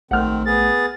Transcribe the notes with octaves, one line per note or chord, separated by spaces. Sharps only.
A#1 D#3 A3 C4 F#5 F6
B3 G#4 A6